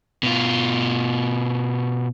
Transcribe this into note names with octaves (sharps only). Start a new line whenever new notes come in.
B2 F4